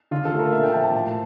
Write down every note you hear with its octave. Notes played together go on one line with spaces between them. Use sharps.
D3 F4
A4
A3
A#4
A#2 E5
G5
F3 A#3 A5
A5
A2